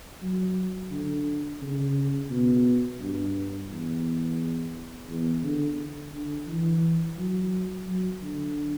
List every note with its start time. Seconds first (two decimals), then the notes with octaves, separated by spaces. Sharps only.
0.22 F#3
0.91 D3
1.61 C#3
2.30 B2
3.00 G2
3.70 E2
5.09 E2
5.44 D3
6.12 D3
6.47 E3
7.18 F#3
7.87 F#3
8.22 D3